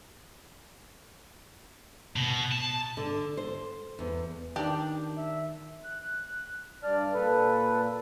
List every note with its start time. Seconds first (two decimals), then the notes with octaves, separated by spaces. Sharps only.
2.16 B2
2.52 A5
2.97 D3
3.37 C5
3.99 E2
4.56 D#3 D4 D#4 G4
5.17 E5
5.84 F#6
6.83 G2 D4 D5 F6
7.14 A#2 A4 B4